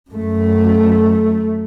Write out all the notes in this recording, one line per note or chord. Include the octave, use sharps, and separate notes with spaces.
F#2 A3